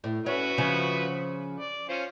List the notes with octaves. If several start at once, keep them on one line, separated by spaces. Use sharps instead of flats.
A2
C#4 F#4 B4 E5
C#3 F3
D5
C#4 F4 C5